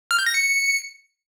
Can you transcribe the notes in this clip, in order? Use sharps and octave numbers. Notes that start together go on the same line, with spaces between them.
F6
G6
A#6
C#7